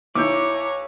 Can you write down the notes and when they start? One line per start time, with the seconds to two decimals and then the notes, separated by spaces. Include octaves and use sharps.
0.15 B1 E4 C#5 A#5 D6 E6 G6